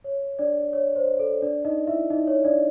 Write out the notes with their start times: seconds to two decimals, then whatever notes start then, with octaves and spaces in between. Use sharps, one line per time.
0.04 C#5
0.39 D4 D5
0.73 C#5
0.96 C5
1.19 A4
1.42 D4 D5
1.65 D#4 D#5
1.87 E4 E5
2.10 D#4 D#5
2.27 C#5
2.44 D4 D5